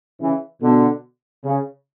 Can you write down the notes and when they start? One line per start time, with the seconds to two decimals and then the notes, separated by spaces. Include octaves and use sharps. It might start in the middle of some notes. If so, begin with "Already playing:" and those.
0.20 C#3 E3
0.61 B2 D3
1.44 C#3